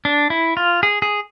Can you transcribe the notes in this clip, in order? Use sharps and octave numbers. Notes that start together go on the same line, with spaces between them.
D4
E4
F4
G#4
G#4